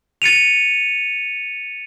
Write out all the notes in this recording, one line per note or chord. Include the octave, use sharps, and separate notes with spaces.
A6 C#7 D#7 F7